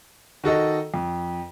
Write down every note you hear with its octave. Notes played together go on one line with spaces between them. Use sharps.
D#3 F#4 A4 D#5
F2